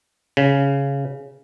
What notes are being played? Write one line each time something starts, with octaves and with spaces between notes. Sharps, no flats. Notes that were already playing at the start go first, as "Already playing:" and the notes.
C#3